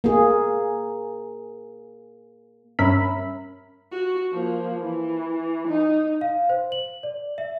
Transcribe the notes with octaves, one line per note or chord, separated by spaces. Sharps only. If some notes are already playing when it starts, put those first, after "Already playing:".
A#3 G#4
G2 C#4 A#4 E5 B5
F#4
F3 A#3
E3
D#4
F5
C5
F#7
D5
E5